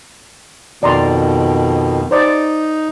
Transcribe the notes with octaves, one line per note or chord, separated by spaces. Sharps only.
F2 B2 D#3 D5 A#5 C6
D#4 C5 D5 D#5